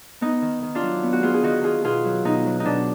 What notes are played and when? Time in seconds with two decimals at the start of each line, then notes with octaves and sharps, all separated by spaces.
0.21 B3 D#4
0.42 D#3
0.62 D#3
0.75 D4 F4
0.83 F#3
1.03 B3
1.13 F#4
1.23 B3 F4 G#4
1.34 G#4
1.43 D#3 D#4 F#4
1.64 D#3 F4 G#4
1.84 B2 F4 G#4
2.05 F#3
2.25 B2 D#4
2.46 F#3
2.60 D#4
2.65 B2 D4